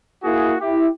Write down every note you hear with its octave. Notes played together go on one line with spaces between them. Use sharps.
A#3 E4 F#4 G#4
E4 G4